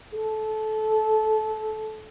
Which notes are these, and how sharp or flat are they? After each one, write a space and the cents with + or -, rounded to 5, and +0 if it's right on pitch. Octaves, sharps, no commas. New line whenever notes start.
A4 -20